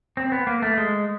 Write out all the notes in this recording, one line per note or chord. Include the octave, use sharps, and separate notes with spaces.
C4
B3
A#3
A3
G#3